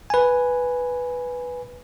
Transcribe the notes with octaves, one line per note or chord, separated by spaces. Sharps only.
B4 G#5